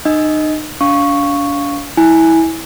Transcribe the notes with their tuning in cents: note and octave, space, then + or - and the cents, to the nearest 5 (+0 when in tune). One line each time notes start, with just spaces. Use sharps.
D#4 -35 D#5 +10
D4 -40 F5 +0 C#6 +0
E4 -20 G#5 +0